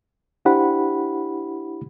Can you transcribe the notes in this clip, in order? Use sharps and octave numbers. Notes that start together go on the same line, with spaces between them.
D4 E4 G4 C5 F#5 B5